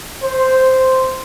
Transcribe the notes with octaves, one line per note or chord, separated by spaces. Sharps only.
C5